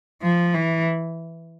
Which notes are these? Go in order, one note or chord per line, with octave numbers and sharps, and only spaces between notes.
F3
E3